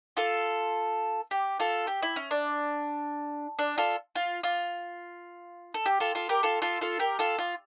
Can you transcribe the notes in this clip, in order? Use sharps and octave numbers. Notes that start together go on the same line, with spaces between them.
F4 A4
G4
F4 A4
G4
E4
C#4
D4
D4
F4 A4
F4
F4
A4
G4
F4 A4
F4 A4
G4 A#4
F4 A4
F4 A4
F4 A4
G4 A#4
F4 A4
F4